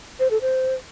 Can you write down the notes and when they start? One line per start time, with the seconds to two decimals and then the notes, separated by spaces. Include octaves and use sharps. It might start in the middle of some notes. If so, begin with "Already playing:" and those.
0.20 C5
0.31 A4
0.42 C5